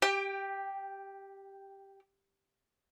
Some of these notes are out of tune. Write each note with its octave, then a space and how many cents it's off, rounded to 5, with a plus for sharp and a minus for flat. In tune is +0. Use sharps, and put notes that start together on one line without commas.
G4 +0 G5 +25